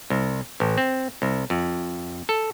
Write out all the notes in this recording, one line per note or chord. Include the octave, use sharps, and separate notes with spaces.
C2
A1
C4
C2
F2
A4